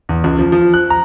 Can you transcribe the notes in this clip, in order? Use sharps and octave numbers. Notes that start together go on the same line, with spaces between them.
E2
C#2
F3
F3
F#6
A#5